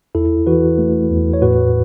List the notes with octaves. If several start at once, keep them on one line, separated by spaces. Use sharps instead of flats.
E2 E4 A4
E3 F#4 B4
A3
E2
C#5
A2 F#4 B4